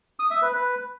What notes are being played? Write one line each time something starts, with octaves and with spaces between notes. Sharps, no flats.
D#6
E5
B4
B4